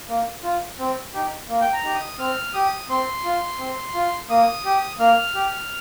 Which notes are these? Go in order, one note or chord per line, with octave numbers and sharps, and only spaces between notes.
A#3
F4
C4
D#4 G4
A#3
G5
A#5
D#4 G4
D#6
C4 F6
G4 D#6
C4 C6
F4
C4
F4
A#3 D#6
G4
A#3 F6
G4